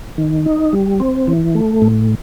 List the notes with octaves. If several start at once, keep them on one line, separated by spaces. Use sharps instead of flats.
D#3
D#4
G3
C4
E3
A3
A2